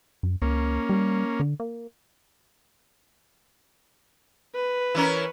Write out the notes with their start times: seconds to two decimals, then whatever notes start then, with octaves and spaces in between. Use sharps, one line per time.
0.23 F#2
0.42 C#2 A#3 C#4
0.89 G3
1.40 D3
1.60 A#3
4.55 B4
4.95 E3 C#4 A#4